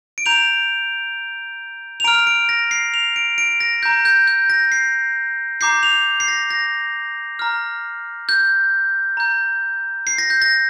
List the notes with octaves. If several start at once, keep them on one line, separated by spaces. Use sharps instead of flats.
D7
A#5 G6 F7
F7
A#5 F6 D7
D7
A#6
C7
F7
D7
D7
A#6
A#5 G6
G6
G6
A#6
C7
A#5 D6 G6 C7
F7
C7
A#6
A#6
A#5 F6
G6
A#5 G6
C7
A#6
G6
A#6